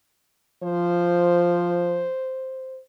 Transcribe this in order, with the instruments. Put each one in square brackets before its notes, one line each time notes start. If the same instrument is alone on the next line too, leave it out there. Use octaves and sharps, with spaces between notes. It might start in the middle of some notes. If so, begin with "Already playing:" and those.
[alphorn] F3 [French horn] C5